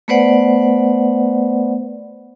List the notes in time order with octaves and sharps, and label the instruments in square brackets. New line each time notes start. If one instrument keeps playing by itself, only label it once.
[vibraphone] A3 B3 B4 C5 D5 F#5